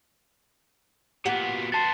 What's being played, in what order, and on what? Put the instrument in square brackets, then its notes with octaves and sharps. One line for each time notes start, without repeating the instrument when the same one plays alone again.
[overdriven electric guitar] A#2 B3 [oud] F#4 G4
[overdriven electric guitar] B3 C5 [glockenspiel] A5 A6